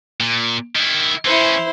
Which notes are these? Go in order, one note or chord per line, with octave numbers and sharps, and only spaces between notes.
A#2
D#3 E4
E3 C#4 E4 C5